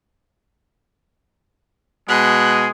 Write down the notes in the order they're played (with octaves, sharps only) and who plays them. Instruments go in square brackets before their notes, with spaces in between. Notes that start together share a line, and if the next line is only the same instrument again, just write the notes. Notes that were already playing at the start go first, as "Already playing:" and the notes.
[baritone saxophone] B2 [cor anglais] G#3 [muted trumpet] G#4 [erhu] F#6